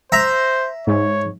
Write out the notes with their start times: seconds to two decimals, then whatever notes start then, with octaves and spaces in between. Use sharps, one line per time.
0.12 C5 E5 A#5
0.87 G#2 C#5